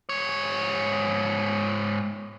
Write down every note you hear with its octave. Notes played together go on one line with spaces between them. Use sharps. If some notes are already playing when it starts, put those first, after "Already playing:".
G#2 C#5